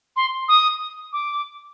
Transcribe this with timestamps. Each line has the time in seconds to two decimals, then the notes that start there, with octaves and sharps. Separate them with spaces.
0.16 C6
0.48 D#6
1.13 D6